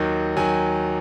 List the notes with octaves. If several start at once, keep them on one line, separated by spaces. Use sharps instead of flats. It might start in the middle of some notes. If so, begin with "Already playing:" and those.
Already playing: D#2 D#3 F#3
D#3 F#3 G#5